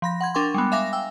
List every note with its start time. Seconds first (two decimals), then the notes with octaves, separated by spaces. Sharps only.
0.02 F3 B5 A#6
0.21 F#5 C6 G#6
0.34 D4 A#4 G5 C6 C#6
0.54 G3 G#3 B3
0.72 E5 F5 G#5 D6 A#6
0.93 G5 E6